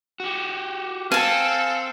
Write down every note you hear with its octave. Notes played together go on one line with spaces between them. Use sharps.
F#4 G4
C4 A4 F5 G#5 A5